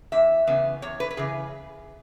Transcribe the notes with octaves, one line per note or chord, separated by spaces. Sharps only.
E2 E5
C#3 E3 B3
E2 C#5
B4
B4
C#3 E3 G#4